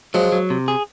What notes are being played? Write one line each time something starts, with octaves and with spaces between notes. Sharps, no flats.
F3 F#3 G#3
F#3
C3
G#4